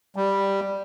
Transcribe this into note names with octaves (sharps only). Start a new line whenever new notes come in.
G3